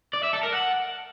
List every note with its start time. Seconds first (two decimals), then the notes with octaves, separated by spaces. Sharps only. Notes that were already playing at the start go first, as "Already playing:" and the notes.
0.13 D5
0.23 E5
0.33 A4
0.43 A#4
0.53 F#5